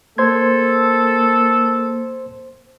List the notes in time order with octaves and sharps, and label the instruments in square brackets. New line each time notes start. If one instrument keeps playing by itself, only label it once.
[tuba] A#3 [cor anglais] A4 [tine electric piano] C5 C6 G#6